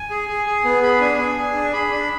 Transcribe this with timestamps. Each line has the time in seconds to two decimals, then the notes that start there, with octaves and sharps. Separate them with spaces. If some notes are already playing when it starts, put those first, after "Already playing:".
Already playing: G#5
0.10 G#4
0.28 G#4
0.46 G#4
0.64 B3
0.83 G#4 B5
1.00 D4 G#5
1.19 G#4
1.37 G#4
1.54 D4
1.73 G#4 B5
1.91 D4